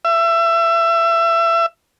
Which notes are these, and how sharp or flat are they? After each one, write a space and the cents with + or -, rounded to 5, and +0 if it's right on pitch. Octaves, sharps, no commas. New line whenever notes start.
E5 +25